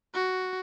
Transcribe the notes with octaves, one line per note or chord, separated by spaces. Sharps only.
F#4